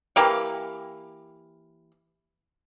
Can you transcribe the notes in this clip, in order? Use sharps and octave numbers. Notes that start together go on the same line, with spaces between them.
E3 A#3 G4 F5